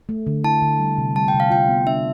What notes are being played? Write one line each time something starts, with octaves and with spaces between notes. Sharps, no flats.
A3
D3
E4 A5
D3
G3
C3
G3 A5
G5
C3
F5
F4 G5
B3
D4 E5